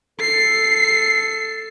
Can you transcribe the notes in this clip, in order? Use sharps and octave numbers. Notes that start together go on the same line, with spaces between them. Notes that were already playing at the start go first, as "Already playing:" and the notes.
A4 C7